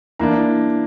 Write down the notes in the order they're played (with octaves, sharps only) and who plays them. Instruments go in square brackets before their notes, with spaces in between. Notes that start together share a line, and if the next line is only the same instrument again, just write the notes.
[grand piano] E3 A#3 D4 A#5